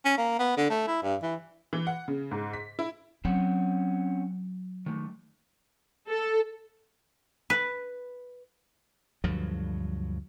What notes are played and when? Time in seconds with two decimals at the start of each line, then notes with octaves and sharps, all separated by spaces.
0.05 C#4
0.18 A#3
0.39 B3
0.57 D3
0.70 A3
0.87 E4
1.03 G2
1.23 E3
1.73 E3
1.87 F#5
2.08 C#3
2.31 G#2
2.53 B6
2.79 E4
3.25 F#3 C4 C#4 F#5
4.86 D#3 A3
6.09 A4
7.50 B4
9.24 D2 G2 F3 F#3